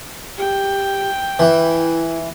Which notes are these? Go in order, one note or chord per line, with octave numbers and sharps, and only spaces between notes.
G4 G5
E3 E4